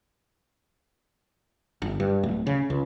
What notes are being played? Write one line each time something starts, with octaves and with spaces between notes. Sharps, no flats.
G1
G2
D1
C#3
C#2